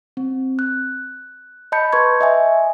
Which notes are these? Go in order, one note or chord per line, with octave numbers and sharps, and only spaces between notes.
C4
F#6
D#5 A5 B5 G6 C#7
B4 C6 C#6 G#6
D#5 E5 G#5